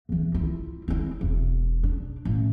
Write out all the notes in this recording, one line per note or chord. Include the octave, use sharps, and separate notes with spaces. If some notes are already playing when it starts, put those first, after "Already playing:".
E2 E3
E4 F4
C4 E4
E1
D4
A1